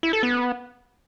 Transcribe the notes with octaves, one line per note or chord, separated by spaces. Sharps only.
E4
A4
B3